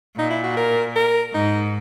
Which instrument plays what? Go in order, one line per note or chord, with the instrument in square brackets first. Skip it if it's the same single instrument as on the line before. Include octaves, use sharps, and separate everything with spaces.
[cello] A#2 [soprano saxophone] D#4
[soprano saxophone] E4
F#4
A#4
A#4
[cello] G#2 [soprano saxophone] D#4